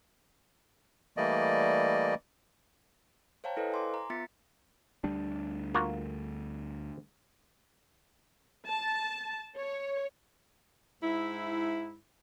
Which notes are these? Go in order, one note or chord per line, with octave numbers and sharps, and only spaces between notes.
E3 G3 A3 A#3 D5 D#5
C5 C#5 F5 G5 A5 A#5
E4 A4 B4 C5 D#5 F5
G#5 C6 D6
A#5
B3 F4 E5 A6 B6 C#7
D2 G3 D4
A#3 F4 F#4
A5
C#5
G#2 E4